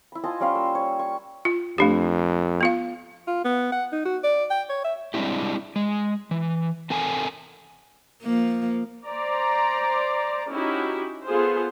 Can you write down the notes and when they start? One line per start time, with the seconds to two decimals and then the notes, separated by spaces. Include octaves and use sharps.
0.12 E4 B5
0.24 F4 D#5 G#5 A5
0.40 G3 C#4 F5 C6
0.55 A#3 E6
0.75 C#5
0.99 C#6
1.45 F4
1.78 F2 A3 D4 G4
2.61 B3 F4 F5
3.27 F4
3.45 B3
3.72 F#5
3.92 D#4
4.05 F#4
4.24 D5
4.51 G5
4.69 C#5
4.84 E5
5.14 G3 G#3 C4 D4 E4 G4
5.76 G#3
6.31 E3
6.90 C4 A4 A#4 F#5 G#5
8.23 F3 A#3
9.05 C5 D5 A#5
10.50 C#4 D#4 E4 F#4 G4
11.28 B3 F4 G#4 A4 C5